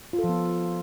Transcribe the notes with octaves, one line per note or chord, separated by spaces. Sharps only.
F4
A4
F3
B3